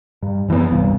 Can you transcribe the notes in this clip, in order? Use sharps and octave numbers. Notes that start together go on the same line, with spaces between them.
G2
F#2 E3 A3 B3
E1 C2 G2